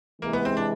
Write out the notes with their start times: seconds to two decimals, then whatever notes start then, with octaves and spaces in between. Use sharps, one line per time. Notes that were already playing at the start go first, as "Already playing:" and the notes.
0.22 C3 E3 G#3 A#3
0.33 B3
0.45 C4
0.57 D4